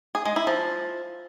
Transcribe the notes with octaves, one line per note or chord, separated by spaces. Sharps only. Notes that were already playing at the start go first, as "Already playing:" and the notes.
G#4
G#3
E4
F3